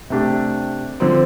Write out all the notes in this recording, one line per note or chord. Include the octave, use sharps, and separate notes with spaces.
C3 A3 D4 G4
D3 F3 C4